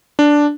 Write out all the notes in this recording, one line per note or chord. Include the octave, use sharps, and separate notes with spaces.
D4